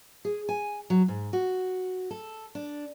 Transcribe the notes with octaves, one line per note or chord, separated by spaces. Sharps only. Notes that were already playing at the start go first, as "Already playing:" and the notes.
G#4
G#5
F#3
G#2
F#4
A4
D4